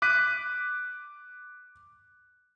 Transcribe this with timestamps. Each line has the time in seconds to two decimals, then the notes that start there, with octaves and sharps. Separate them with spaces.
0.02 D6 F#6 B6 D#7